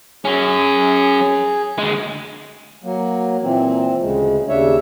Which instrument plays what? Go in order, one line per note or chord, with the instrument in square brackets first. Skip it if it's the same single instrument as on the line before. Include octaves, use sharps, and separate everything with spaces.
[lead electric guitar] F#3 C#4 [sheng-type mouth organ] G#4
[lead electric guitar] D2 G#3
[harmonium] F#3 A#3
A#2 E3 C4
D2 C#3 G#3
D#2 C#3 D4 C#5 E5